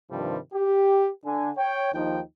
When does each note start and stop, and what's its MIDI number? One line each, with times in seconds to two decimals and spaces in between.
0.10 0.37 43
0.10 0.37 48
0.10 0.37 51
0.10 0.37 53
0.10 0.37 55
0.54 1.09 67
1.25 1.51 50
1.25 1.51 80
1.58 1.90 73
1.58 1.90 79
1.94 2.20 39
1.94 2.20 53
1.94 2.20 63
1.94 2.20 79